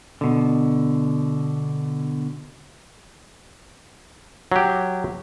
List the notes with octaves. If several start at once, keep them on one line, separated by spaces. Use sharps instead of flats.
B2 D3
F#3 G4